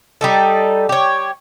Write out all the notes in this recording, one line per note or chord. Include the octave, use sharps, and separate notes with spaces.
G3 D#4 A4
G4 C#5